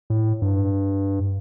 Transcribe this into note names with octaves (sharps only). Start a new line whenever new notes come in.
A2
G2